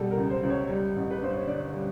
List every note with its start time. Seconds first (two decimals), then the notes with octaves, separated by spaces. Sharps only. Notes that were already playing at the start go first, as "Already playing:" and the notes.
Already playing: B2 G3 A4
0.11 A#4
0.17 C#2
0.30 C5
0.43 C#2
0.50 C#5
0.69 G3
0.96 A1
1.11 B4
1.21 G2 C5
1.36 C#5
1.47 D3 D5
1.73 G3